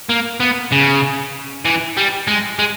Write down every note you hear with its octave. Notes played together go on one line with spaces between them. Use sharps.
A#3
B3
C#3
E3
G3
G#3
G#3